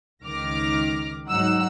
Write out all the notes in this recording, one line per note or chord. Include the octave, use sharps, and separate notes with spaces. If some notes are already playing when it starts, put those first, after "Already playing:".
C#2 D#3 D6 F6 A#6
G#2 F#3 D#4 F#5 E6